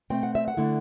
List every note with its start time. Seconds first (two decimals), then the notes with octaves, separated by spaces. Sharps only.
0.10 B2 A3 C4 G5
0.23 F#5
0.35 E5
0.48 F#5
0.57 D3 A3 E4